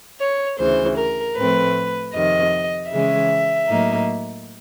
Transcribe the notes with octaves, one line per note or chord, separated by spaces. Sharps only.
C#5
D2 C#3 E3 C5
A#4
A2 F3 A3 C4 B4
F2 C3 D#3 D#5
C#3 E3 G#3 C#4 E5
A2 F#3 A#3 D#4